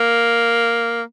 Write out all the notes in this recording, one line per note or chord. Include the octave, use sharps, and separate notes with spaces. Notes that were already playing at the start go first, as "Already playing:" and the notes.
Already playing: A#3